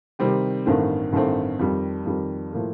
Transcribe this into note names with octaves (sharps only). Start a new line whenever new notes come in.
C3 D#3 G3 C4 G4
A1 G2 D#3 A3 C4
A1 G2 D#3 A3 C4
F2 D#3 G3
F2 D#3 G3
A2 F3 A#3